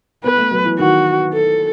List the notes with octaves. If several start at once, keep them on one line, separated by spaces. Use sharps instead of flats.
B3 B4
A3
F#3
E3
D#3 F#4
A4